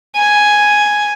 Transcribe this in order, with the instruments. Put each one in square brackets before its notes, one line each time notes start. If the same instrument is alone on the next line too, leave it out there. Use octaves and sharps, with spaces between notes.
[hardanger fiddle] G#5